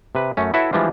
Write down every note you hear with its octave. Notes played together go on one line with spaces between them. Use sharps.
C3 B4
F#2 A3 C#4
E4 F#4 A4 B4 C#5 E5
E3 F3 G3 G#3 D4 F4